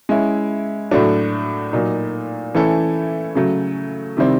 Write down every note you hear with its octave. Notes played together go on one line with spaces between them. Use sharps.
G#3 C#4 E4
A2 F#3 A3 D4 F#4
A#2 F#3 A#3 D#4
E3 A3 C#4 E4 A4
C#3 F#3 A3
C3 D#3 G3 C4 E4